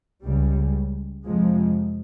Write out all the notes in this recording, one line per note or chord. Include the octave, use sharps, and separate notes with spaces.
C#2 C#3 G3
F2 C3 F3 G#3